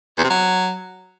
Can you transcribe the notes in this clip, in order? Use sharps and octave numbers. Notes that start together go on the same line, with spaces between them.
E2
C3
F#3